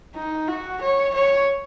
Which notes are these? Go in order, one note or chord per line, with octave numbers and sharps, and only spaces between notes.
D#4
F#4
C#5
C#5